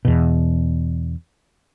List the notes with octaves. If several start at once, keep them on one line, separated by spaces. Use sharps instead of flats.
E2 B2